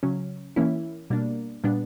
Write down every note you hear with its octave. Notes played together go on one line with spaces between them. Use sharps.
C#3 F#3 C#4
E3 A#3 C#4 E4
B2 G3 A#3 D4
A#2 G3 B3 D4